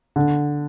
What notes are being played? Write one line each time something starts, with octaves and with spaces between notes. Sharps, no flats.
D3